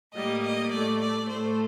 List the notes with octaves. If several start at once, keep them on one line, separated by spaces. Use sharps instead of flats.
A2 G3 A#3 D#5
D#5
A2 A3 D5
D5
A2 A3 C5